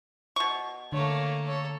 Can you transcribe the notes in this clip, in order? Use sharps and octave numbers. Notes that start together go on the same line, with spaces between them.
B2 C#6
D3 A3 A#3 C#5
A4 C#5